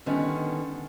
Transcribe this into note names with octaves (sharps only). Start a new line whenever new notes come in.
D3 D#3 G3 B3 C#4